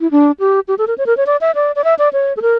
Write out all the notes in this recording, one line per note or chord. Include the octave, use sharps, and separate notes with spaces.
E4
D4
G4
G4
A4
A#4
C#5
A#4
C#5
D5
E5
D5
D5
E5
D5
C#5
A4
A#4